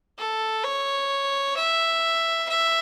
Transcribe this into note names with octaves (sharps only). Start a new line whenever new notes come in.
A4
C#5
E5
E5